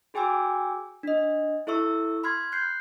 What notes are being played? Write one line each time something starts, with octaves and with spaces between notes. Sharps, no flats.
F#4 G#4 G5 G#5 D6 E6
D4 D#5
E4 A4 E5 C#6 E6
B5 C6 F6 G#6
F#6 G6 C7